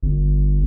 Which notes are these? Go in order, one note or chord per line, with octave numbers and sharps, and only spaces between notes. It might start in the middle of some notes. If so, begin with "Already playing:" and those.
G1